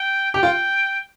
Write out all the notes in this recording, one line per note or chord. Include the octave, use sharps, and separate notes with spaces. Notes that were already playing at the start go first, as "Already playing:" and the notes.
Already playing: G5
G4 G5
F4